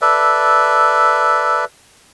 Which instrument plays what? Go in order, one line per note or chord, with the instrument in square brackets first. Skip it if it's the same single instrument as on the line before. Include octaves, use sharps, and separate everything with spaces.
[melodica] A4 B4 D5 E5